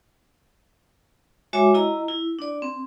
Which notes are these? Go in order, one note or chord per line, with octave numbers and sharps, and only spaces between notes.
G#3 F#4 C#5 E5 G#5 D6
E4 D#5 A#5 E6
E4
D4 D5
C4